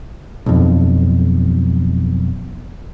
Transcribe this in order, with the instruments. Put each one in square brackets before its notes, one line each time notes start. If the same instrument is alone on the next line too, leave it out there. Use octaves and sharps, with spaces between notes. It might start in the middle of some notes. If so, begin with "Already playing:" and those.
[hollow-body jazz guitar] B1 F2